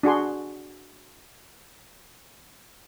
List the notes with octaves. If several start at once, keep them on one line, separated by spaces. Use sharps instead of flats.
D4 F#4 G#4 C6